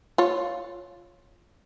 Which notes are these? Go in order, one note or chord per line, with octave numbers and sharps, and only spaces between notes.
F4 C#5